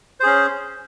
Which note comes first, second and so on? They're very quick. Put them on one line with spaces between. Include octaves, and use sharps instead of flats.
C5 G#4 C#4